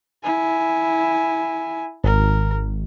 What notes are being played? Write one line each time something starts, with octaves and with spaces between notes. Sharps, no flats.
E4 G#5
G#1 A#4